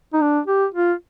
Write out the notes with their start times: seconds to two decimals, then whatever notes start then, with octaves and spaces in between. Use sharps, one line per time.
0.13 D#4
0.21 D4
0.47 G4
0.74 F4